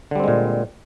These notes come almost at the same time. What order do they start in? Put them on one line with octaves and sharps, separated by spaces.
D3 G3 C4 G#3 A#2